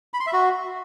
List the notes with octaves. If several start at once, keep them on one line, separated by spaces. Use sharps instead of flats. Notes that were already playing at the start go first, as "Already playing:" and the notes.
B5
C6
E5
F#4